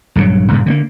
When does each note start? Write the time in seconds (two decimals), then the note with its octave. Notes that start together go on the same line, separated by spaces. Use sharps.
0.16 A#1 G2 C#3 F#3
0.51 G2 A#2 C#3
0.66 D3 A3 A#3